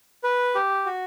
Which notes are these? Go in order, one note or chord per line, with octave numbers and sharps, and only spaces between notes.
B4
G4
F#4